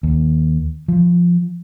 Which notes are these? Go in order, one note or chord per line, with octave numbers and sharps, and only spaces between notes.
D#2
F3